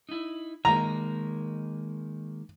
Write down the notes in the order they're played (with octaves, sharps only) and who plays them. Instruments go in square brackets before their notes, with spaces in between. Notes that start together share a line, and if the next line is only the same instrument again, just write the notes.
[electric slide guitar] D#4 E4
[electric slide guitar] D#3 G#3 A#3 [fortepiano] A#5